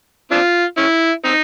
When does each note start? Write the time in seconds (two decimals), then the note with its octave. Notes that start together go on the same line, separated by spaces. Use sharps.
0.31 C4 D4 F4
0.77 C#4 E4
1.25 C4 D#4